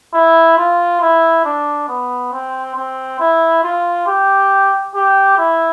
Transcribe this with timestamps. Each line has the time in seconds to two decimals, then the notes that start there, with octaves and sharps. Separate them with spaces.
0.14 E4
0.58 F4
1.01 E4
1.45 D4
1.89 B3
2.33 C4
2.76 C4
3.20 E4
3.63 F4
4.07 G4
4.95 G4
5.38 E4